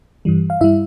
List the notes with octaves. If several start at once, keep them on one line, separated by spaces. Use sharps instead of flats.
G2 E3 G3
F5
G2 G3 E4 E5